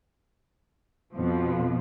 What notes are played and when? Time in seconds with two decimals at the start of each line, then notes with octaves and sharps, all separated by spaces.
1.14 F2 B2 F3